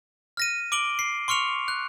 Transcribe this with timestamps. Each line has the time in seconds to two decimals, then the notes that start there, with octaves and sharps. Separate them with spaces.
0.37 F6 A#6 D#7
0.72 D6 D7 F#7 G7
0.99 C7
1.28 C6 C#6 F6 C#7 F7
1.68 F#6